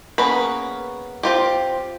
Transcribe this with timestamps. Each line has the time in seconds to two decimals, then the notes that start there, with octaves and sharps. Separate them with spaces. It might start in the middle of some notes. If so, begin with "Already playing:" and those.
0.18 A#3 B3 C#4 G#4 B4
1.23 C4 F4 G4